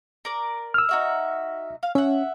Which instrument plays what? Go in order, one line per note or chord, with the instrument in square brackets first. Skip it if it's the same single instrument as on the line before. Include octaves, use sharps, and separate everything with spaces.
[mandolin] A#4 D5
[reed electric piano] E6 F6
[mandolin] D#4 F#4 E5
F5
[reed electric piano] C#4 [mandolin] E5 F#5